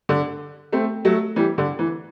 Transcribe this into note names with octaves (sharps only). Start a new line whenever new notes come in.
D3
A3 C4
F#3 A3
E3 G3
D3
E3